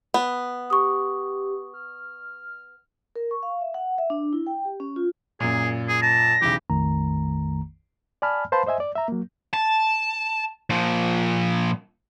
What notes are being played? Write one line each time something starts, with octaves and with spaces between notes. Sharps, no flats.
B3
G4 C#6 D#6
F6
A#4
C#6
F5
E5
F#5
E5
D4
E4
G5
G4
C#4
F4
F#2 A#2 G#4
G#4
A5 A#6
B1 C#3 E3 G4
A#1 F2 D#3 A3 A#5
D5 G#5 A5 B5 F6
B4 C5 F5 A5 B5 C6
C5 D#5 E5 G#5
D5
E5 A#5
F#3 A#3
A5
A#2 F3